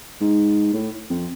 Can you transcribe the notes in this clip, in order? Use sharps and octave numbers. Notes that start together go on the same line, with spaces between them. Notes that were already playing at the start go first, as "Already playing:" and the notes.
G#2
A2
F2